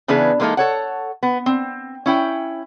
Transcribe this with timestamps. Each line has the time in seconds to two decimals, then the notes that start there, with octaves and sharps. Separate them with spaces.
0.08 C#3 E3 B3 D4 G#4 B4
0.40 E3 G#3 A#3 D#4 A4 A#4
0.57 A4 C#5 F#5
1.23 B3
1.46 C4
2.06 C#4 E4 G5